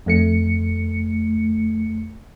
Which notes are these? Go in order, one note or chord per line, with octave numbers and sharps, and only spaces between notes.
F2 A3 C#7